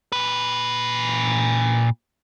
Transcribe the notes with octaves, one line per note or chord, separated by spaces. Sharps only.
A#2 B4